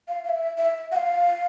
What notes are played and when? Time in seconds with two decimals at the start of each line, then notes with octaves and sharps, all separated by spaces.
0.08 F5
0.25 F5
0.29 E5
0.58 E5
0.92 F#5
0.96 F5